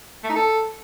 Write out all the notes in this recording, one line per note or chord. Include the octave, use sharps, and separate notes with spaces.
A3
D#4
A4